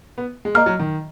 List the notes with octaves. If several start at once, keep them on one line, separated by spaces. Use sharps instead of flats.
B3
G#3
A#3 D#5 A#5 F6
F#3
D#3